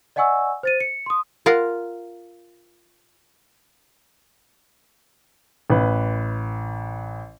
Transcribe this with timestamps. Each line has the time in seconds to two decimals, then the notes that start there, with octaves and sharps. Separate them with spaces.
0.16 D5 D#5 F#5 G#5 C#6 E6
0.63 C5 A6 D#7
0.80 C#7
1.06 C6 D#6
1.46 F4 A#4 F5 F#5
5.70 A1 B4